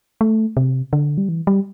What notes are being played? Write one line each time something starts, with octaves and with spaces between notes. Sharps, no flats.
A3
C3
D3
G3
E3
G3